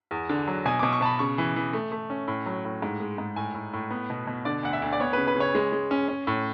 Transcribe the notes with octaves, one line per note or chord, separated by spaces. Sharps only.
E2
D3
F#3
B2 G#5
B2 D6
C#6
B2 A5 B5
C#3 C#6
E3
E3
A3
A3
C#4
A2
F#3
A2
G#2
G#3
G#2
A2 G#5
A2
A2
B3
B2
B2
D3 D5
D2 F#5
E5
D2
D5
B3 C#5
C#3 B4
B4
C#3 C#5
G#3
G#3
C#4
C#4
A2